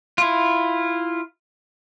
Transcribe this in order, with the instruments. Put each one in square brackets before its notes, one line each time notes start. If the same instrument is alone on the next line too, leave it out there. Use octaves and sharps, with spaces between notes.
[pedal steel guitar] E4 F4